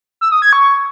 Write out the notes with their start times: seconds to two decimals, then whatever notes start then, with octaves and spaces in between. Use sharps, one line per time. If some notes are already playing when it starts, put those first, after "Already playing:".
0.21 E6
0.32 D#6
0.42 G#6
0.53 C#6